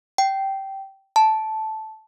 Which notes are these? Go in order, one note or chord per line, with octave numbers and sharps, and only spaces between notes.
G5
A5